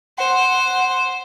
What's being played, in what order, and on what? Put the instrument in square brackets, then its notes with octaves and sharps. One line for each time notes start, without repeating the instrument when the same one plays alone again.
[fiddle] C5 [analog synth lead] F#5